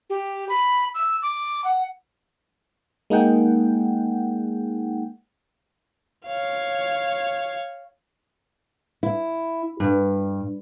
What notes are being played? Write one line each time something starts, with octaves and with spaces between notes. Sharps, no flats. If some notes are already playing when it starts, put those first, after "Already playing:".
G4
B5
E6
D6
F#5
G#3 A#3 D#4 G#4 F#5 G5
C#5 F5
E4
G2